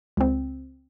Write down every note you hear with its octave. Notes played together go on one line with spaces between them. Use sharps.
C#2 C4